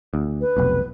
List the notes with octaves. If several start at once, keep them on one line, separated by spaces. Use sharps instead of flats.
D2
B4
F1 B1